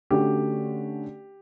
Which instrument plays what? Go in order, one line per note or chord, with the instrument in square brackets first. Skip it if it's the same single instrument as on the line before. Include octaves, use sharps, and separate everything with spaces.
[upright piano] D3 A3 C#4 F#4 [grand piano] G4